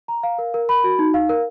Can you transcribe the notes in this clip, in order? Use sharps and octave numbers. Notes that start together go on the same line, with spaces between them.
A#5
F5
A#4
A#4
B5
F#4
D#4
F5
A#4